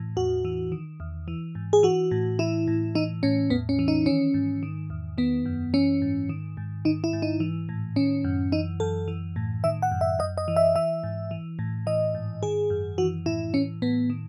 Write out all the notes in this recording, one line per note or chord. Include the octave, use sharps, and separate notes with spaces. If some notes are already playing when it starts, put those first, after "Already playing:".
Already playing: A2 E3
E2 F#4
E3
D#3
E2
E3
G#2
G#4
E3 F#4
A2
E3 E4
A2
E3 D#4
A2 C#4
E2 B3
C#4
E3
D#4
D#3 C#4
G#2
D#3
E2
D#3 B3
F#2
E3 C#4
G#2
D#3
G#2
D#3 D#4
E4
G#2
D#4
E3
A2
D#3 C#4
F#2
E3 D#4
F#2 A4
E3
A2
D#3 E5
F#5
F#2
E5
F#2 D#5
D#5
E3
E5
E3 E5
G#2
E3
A2
E3 D#5
G#2
D#3 G#4
F#2
E3 F#4
A2 E4
E3 C#4
A2 B3
D#3